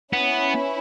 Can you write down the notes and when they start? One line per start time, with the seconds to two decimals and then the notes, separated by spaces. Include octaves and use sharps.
0.13 B3 C#4 E4 B4 E5